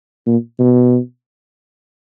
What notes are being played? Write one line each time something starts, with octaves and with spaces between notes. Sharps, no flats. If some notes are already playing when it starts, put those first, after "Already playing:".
A#2
B2